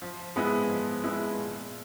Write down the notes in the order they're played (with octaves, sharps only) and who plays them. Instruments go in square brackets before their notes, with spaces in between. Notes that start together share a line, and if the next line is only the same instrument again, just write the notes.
[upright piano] F3
G#3 B3 E4
F3
G#3 B3 E4
A#2